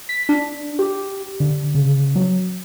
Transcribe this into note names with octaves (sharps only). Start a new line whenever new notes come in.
B6
D4
G4
D3
C#3
F#3